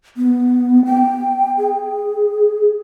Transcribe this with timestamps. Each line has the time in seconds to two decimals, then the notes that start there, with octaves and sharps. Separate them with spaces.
0.17 B3
0.85 G5
1.58 G#4